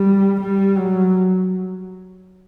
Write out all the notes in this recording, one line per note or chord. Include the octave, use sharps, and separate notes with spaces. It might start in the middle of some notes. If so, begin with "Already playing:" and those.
Already playing: G3
G3
F#3